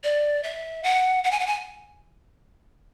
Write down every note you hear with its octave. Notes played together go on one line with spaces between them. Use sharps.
D5
E5
F#5
F#5
G#5
F#5
G#5